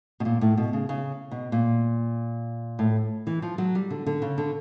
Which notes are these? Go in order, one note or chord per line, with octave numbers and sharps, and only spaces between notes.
B2
A#2
A2
B2
C#3
C#3
B2
A#2
A2
E3
F3
F#3
G3
D3
D3
C#3
D3